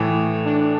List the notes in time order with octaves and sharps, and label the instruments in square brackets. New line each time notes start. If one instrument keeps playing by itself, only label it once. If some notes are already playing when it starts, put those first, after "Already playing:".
Already playing: [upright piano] A2 E3 A3
[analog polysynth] D4